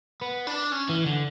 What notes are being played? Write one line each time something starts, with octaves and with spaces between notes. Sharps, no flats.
B3
D4
C#4
E3
D3